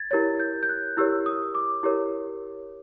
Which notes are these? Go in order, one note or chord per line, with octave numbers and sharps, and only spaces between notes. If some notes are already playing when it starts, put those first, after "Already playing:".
Already playing: G#6 A6
E4 G4 A#4 C#5 A6
G6
G6
F#6
E4 G4 A#4 C#5 E6
D#6
D6
E4 G4 A#4 C#5